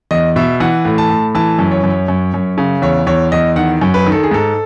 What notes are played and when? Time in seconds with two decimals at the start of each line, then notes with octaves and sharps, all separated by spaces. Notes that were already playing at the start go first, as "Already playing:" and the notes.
0.11 E2 D#5
0.36 B2 E5
0.60 E3 F#5
0.85 A2
0.98 A5
1.10 A2
1.35 E3 A5
1.59 F#2
1.71 C#5
1.83 F#2
2.08 F#2
2.34 F#2
2.58 C#3
2.82 E2 C#5
3.07 E2 C#5
3.32 E2 D#5
3.56 D#3 F#5
3.81 F#2
3.94 B4
4.06 D#3
4.12 A4
4.23 G#4
4.31 G#2 A4